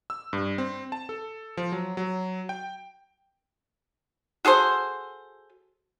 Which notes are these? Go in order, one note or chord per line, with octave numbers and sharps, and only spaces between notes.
E6
G2
C4
A5
A4
F3
F#3
F#3
G5
F#4 G#4 A4 C5